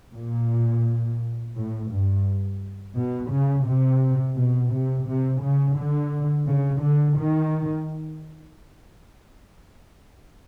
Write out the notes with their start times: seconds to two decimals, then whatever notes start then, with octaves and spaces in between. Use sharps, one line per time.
0.13 A#2
1.55 A2
1.90 G2
2.96 B2
3.31 C#3
3.66 C3
4.37 B2
4.72 C3
5.07 C3
5.42 C#3
5.77 D3
6.47 C#3
6.83 D3
7.19 D#3